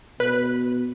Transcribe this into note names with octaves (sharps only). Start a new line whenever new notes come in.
B2 B4 F#6